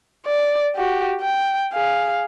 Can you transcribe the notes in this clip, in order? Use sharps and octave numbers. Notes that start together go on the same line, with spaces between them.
D5
F#4 G4
G5
G#4 F5